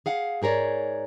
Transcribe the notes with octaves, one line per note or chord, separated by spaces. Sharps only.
G#4 F5 F#5
G#2 G#4 A#4 C#5 D5